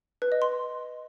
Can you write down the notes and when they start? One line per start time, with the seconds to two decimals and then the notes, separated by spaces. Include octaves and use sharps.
0.22 B4
0.32 D#5
0.42 C6